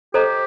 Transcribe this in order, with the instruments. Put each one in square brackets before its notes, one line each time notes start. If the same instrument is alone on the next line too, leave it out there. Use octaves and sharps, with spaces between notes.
[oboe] G4 [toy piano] A4 C5 D#5 A#5